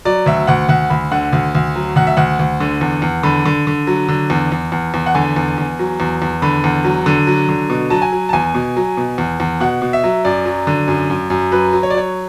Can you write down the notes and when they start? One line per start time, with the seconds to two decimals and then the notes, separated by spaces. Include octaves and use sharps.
0.05 F#3 D5
0.26 D2 E5
0.47 D2 F#5
0.69 D2 F#5
0.90 D2 B5
1.12 D3 F#5
1.33 D2
1.55 D2
1.76 F#3
1.96 D2 F#5
2.07 E5
2.17 D2 F#5
2.39 D2
2.60 D3
2.81 E2
3.02 E2
3.23 D3 B5
3.45 D3
3.67 D3
3.87 F#3
4.08 D3
4.30 E2
4.52 E2
4.72 E2
4.94 E2
5.06 F#5
5.15 D3 G#5
5.36 E2
5.58 E2
5.79 F#3
6.00 E2
6.22 E2
6.42 D3 B5
6.64 E2
6.84 F#3
7.06 D3
7.27 F#3
7.49 D3
7.70 B2
7.90 F#3 A5
8.02 G#5
8.12 F#3
8.29 A5
8.33 E2 G#5
8.55 B2
8.77 F#3
8.97 B2
9.18 E2
9.40 E2
9.60 B2 F#5
9.82 B2
9.93 E5
10.04 F#3
10.25 F#2 D5
10.45 F#3
10.67 D3
10.88 F#2
11.10 F#2
11.30 F#2
11.52 F#3 B4
11.73 F#3
11.83 C#5
11.90 D5
11.94 F#3 C#5